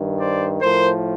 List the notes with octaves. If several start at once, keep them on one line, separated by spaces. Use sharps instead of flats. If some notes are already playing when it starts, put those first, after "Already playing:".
Already playing: G2 D#3
C5 D5
A2 F3 A#4 C5